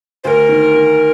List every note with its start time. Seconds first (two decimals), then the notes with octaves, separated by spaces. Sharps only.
0.24 D2 A#4 C5
0.49 D#3
0.74 D#3